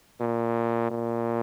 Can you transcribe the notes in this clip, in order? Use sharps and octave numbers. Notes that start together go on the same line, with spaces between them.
A#2
A#2